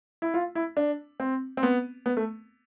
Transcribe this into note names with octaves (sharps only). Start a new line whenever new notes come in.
E4
F4
E4
D4
C4
C4
B3
B3
A3